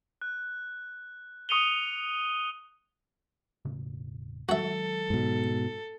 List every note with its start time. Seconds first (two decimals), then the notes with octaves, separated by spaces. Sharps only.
0.22 F#6
1.49 C#6 D#6 C#7 D#7 F7 G7
3.65 E1 A2 C#3
4.49 D#3 F#3 G#3 F#4 A4 E5
5.10 G#2 B2